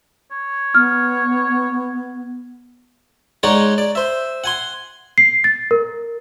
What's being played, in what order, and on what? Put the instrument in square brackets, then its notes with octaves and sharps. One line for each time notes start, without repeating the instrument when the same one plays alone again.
[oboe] C#5
[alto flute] B3 [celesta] F6
[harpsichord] G#3 D#4 G#4 C#5 D5 F#5
D5
C5 E5
F#5 G#5 C6
[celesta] C7
A6
A#4